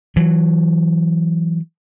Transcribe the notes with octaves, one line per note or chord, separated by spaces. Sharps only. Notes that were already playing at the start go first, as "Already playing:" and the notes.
E3 F#3